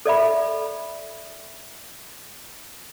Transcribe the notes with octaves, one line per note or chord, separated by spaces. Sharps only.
A4 D5 E5 B5